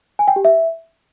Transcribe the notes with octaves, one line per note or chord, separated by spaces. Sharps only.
G#5
G5
G4
E5